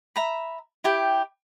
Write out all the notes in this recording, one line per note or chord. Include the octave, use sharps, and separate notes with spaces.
E5 A#5 B5
E4 G4 G5